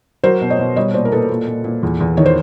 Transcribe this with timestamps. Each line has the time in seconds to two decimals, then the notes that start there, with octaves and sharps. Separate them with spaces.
0.23 F#3 A#4 C5
0.42 B2
0.50 C#5 D#5
0.59 B2
0.76 G3 C#5 D#5
0.94 A#2 C5 D5
1.05 A#4
1.12 A#2 A4 B4
1.30 A#2
1.47 A#2
1.64 A#2
1.83 E2
2.00 E2
2.17 D#3 C#5
2.26 C5